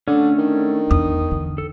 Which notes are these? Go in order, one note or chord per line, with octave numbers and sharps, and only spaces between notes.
D3 A3 C#4 D4
D#3
E2 D#6
D3
A4